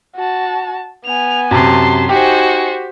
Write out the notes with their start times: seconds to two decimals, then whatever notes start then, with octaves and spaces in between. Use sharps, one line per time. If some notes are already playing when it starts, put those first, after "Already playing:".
0.16 F#4 A5
1.05 B3 G#5 F7
1.51 F#2 C3 A5 C6
2.09 D#4 F#4 G4 C5 G#5